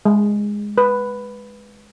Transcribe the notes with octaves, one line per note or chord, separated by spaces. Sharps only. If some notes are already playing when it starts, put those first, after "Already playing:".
G#3
B4